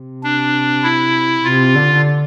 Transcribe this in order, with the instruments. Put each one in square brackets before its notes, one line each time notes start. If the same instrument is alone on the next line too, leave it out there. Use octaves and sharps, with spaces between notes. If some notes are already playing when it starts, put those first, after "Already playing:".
Already playing: [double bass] C3
[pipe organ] D4
E4
[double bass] C3 [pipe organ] F4
[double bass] D3